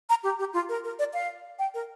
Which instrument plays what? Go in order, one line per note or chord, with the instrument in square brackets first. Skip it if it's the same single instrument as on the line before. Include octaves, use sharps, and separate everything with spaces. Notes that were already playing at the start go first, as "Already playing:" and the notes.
[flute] A#5
G4
G4
F4
A#4
A#4
D5
F5
G5
A#4